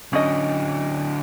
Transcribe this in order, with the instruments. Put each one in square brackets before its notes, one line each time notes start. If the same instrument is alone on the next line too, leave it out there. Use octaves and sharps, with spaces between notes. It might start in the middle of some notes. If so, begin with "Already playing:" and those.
[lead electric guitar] D3 F#3 [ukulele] C#4 D#5